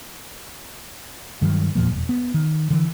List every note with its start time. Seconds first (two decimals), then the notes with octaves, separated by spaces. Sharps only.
1.42 G2 D#3 F#3
1.75 E2 A#2 F3 A#3
1.91 E1
2.09 B3
2.34 D#3
2.70 D3 E3